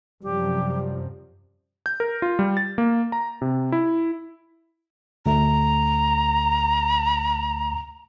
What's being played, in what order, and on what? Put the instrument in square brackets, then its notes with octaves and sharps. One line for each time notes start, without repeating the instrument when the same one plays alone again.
[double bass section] F#2 C3 F3 [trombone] G3 [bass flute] G4
[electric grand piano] G6
A#4
F4
G3
A6
A#3
A#5
C3
E4
[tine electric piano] D2 A3 [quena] A#5